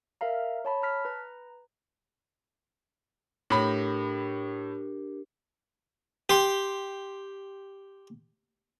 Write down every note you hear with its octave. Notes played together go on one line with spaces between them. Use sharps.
A#4 E5 F5 A#5
C#5 A5 B5
A5 A#5 F6 B6
B4 A#5
A2 D4 G4 A#4 B5
G4 C6